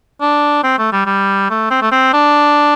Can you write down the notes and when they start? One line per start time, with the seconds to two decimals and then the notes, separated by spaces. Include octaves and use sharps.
0.21 D4
0.63 C4
0.78 A3
0.93 G3
1.06 G3
1.50 A3
1.70 C4
1.82 A3
1.92 C4
2.13 D4